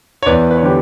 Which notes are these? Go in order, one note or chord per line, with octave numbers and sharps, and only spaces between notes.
C#5
E2 B4 D5
B4
C#5
D3 G3 G4 B4